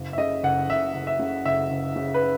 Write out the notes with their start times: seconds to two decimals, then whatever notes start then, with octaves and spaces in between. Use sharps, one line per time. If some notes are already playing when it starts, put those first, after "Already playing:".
Already playing: F#1
0.13 E5
0.18 C#3 D#5
0.43 F#1 F#5
0.69 F#1 E5
0.94 F#1
1.07 E5
1.19 C#3
1.45 F#1 E5
1.71 F#1
1.96 C#3
2.14 B4